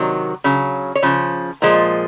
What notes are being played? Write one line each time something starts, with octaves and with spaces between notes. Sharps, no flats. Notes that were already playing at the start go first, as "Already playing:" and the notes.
Already playing: C3 D#3 F#3
C#3 F#3
C#5
C#3 F3
A#2 F3 G#3